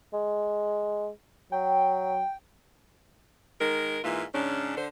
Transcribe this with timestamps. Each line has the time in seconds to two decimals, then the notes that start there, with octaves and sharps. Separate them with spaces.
0.13 G#3
1.52 F#3 G5
3.60 D#3 G#3 A#4
4.04 G#2 E3 A#3 F4
4.34 G#2 C#3 C#4 D4
4.77 D3 C5